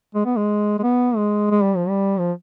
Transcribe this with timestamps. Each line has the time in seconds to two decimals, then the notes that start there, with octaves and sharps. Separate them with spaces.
0.15 G#3
0.26 B3
0.36 G#3
0.79 G#3
0.83 B3
1.16 G#3
1.51 G#3
1.63 G3
1.76 F3
1.89 G3
2.19 F3